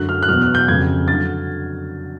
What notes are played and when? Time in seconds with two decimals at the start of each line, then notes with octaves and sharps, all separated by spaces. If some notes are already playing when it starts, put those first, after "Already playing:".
Already playing: F#2 D3 F#3 F#6
0.09 F6
0.22 F#6
0.28 E2 B2 F#3 F6
0.42 F#6
0.55 G6
0.68 F2 C#3 F#3 G#6
1.08 D3 F#3 A6